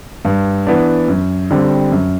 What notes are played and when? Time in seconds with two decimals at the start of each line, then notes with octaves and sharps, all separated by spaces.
0.25 G2
0.67 E3 B3 D4
1.08 F#2
1.51 D3 G3 C4
1.92 F#2